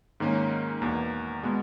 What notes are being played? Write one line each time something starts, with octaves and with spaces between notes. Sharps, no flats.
G#2 D#3 A#3 C#4
E2 B2 A#3
B2 G#3 B3